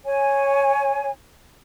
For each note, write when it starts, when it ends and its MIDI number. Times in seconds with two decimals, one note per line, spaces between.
0.05 1.10 73
0.05 1.10 80